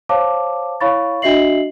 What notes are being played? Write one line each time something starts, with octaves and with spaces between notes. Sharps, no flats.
C5 C#5 F5 A5 D6
E4 C#5 F5 B5 C#6 A6
D4 F#4 D#5 E5 C7 F#7